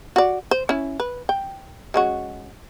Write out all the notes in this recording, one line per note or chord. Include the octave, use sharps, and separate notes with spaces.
F#4 D5
C5
C#4 E4
B4
G5
G#3 C#4 F#4